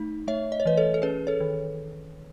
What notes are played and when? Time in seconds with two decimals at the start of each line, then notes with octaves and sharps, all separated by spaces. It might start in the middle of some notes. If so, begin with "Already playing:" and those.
Already playing: A3 D#4
0.28 A3 C#5 E5
0.52 D#5
0.60 C#5
0.66 E3 B4 D#5
0.77 A4 C#5
0.94 A4
1.02 C#4 G#4 B4
1.27 A4 C#5
1.40 D#3